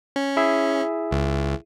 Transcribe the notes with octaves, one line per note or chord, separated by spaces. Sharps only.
C#4
E4 G#4 E5
C#2